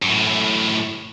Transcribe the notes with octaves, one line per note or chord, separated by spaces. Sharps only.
F#2 A2